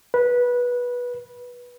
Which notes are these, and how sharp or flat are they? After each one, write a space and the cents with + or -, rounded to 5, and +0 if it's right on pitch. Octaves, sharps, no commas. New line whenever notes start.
B4 -15